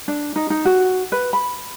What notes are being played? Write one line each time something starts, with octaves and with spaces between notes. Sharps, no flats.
D4
D#4
D#4
F#4
B4
B5